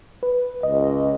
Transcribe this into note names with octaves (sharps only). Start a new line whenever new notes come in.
B4
C#2 D#5